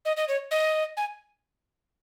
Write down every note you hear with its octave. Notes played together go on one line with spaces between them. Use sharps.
D#5
D#5
C#5
D#5
G#5